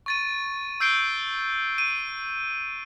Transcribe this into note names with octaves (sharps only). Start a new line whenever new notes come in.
C#6 A6 D#7
E6 G6 C7 D7 G7
D#7